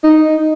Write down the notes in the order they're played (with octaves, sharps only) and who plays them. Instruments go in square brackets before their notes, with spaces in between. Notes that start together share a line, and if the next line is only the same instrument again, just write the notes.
[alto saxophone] D#4